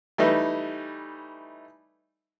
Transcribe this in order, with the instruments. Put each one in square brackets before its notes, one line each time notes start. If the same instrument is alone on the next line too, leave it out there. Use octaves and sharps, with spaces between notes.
[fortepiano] E3 G3 A3 D#4